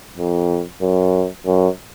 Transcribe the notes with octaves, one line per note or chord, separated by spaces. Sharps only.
F2
F#2
F#2